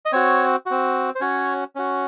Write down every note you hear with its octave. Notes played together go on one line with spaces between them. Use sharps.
D#5
C4 F#4 C#5
C4 F#4
C5
C#4 F#4 C#5
C#4 F#4